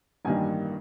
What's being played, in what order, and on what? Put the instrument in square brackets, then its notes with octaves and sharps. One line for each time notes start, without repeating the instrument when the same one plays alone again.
[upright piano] A1 G2 D#3 G3 A#3 G#5